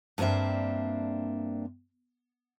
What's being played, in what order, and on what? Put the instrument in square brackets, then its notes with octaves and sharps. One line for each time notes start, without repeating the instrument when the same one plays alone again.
[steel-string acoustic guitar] G2 A#3 C4 D4 E5